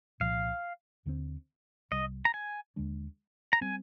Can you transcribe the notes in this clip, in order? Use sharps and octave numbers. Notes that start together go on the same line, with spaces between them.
C2 A#2 F3 F5
D#2 D3 G3 C4
C2 C3 G3 D#5
A#5
G#5
D#2 D3 G#3 D4
A#5
G3 C4 G#5